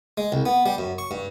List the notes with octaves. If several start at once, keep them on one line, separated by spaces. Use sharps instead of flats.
G#3
C2
B3
G3
F#2
C#6
G2